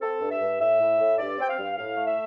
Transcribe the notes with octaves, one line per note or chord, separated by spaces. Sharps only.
C4 A4
G2
E5
G2
A2 E5
A2
A2
G2 D5
C4 G5
F5
G2
A2 F5
A3
E5